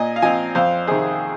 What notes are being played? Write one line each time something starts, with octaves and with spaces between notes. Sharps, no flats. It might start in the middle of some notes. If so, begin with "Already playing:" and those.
Already playing: A#2 D#5 G#5
F5
F3 C4 D#5 G#5
F2 C5 F5
C3 D#3 G#4 C5